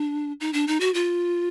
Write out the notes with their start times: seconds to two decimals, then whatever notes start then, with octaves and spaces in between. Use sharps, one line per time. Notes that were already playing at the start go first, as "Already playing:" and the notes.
Already playing: D4
0.40 D#4
0.53 D4
0.67 D#4
0.80 F#4
0.94 F4